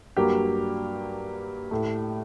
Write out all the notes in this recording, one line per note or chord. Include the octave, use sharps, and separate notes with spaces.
G2 F#3 A#3 G4
A2 A3